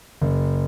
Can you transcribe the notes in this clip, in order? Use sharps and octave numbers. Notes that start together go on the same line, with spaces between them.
F#1